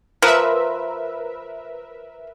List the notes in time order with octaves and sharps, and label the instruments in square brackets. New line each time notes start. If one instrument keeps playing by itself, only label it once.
[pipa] F3 [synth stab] A#4 B4 E5